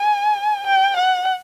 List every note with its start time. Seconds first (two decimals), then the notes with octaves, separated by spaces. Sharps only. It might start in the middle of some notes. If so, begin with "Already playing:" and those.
Already playing: G#5
0.67 G5
0.97 F#5